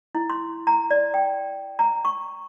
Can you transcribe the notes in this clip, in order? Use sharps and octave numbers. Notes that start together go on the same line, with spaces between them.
E4
C6
A#5
D5
G5
A#5
C#6